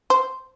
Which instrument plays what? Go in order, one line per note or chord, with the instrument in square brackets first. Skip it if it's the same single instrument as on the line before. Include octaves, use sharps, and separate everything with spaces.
[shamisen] C5